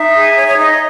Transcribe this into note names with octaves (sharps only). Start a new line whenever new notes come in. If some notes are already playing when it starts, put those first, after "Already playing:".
Already playing: D#4 E5
G#4
C#5
C#5
D#4 D#5